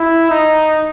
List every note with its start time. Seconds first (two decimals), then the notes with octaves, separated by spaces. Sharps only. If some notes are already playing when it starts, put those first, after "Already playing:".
Already playing: E4
0.30 D#4